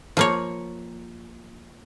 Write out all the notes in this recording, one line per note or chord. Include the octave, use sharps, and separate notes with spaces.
F3 A#3 C#5